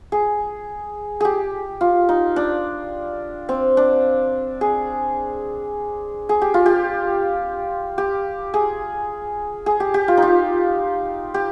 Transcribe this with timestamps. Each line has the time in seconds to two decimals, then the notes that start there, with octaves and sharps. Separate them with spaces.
0.12 G#4
1.20 G4 G#4
1.81 F4
2.09 D#4
2.36 D4
3.49 C4
3.77 D4
4.61 G#4
6.29 G#4
6.42 G4
6.54 F4
6.66 G4
7.98 G4
8.54 G#4
9.66 G#4
9.80 G4
9.94 G4
10.08 F4
10.17 D#4
10.22 F4
11.34 G4